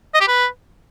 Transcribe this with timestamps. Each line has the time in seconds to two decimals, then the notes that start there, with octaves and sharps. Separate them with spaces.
0.14 D#5
0.21 G4
0.28 B4